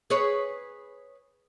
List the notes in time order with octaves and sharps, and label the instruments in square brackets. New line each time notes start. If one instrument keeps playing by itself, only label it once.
[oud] G#4 B4 C#5